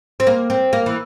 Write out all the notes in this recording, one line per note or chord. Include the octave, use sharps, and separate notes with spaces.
C4
A#3
C4
A#3
E3